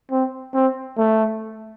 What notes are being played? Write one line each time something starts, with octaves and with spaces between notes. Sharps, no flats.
C4
C4
A3